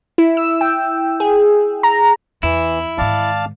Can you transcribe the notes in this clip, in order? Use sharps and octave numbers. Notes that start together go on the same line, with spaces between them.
E4
E6
G5
G#4
A#5
E2 E3 E4
G#2 D#3 D5 F5 A5